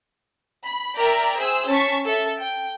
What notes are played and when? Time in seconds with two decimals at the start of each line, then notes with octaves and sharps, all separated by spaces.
0.64 B5
0.97 A#4 D5 E5 G5 A#5
1.36 G#4 C5 E6
1.68 C#4 A5 C#6 B6
2.07 A4 E5
2.40 G5